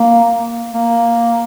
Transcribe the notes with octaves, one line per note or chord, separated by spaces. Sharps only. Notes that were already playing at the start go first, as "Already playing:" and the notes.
Already playing: A#3
A#3